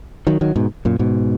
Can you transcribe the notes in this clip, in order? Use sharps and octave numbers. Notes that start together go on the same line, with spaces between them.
D#3 F#3
D#3 F#3
G#2 B2
F#2 A#2
G#2 B2